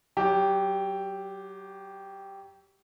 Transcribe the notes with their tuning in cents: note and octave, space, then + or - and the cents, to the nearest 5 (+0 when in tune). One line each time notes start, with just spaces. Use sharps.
F#3 +30 G4 +0